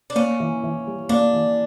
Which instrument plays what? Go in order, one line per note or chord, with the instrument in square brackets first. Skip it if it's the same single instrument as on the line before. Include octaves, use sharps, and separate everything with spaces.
[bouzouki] D4
[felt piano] A#3 [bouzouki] C#4
[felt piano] E3
E3
G3
[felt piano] A#3 [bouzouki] D4
[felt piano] E3